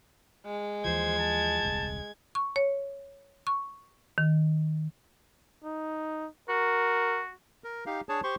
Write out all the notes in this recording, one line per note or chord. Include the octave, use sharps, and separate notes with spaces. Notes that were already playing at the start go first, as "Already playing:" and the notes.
G#3
D#2 E3 F3 C5 G#6
A5
D#1 C2
C#6
C#5
C#6
D#3
D#4
F#4 A#4
A#4
D#4 G4 F5
D4 G#4 C#5 A5
G4 C5 C6 C#6